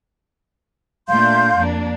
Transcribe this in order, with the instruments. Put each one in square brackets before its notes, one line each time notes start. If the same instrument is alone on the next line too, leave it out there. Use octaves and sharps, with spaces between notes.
[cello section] A#2 A3 D4 [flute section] F5 C6 G6
[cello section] F2 A#3 D4